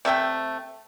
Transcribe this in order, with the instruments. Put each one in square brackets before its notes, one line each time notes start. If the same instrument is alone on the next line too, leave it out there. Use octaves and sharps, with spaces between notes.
[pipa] C3 A3 E5 G5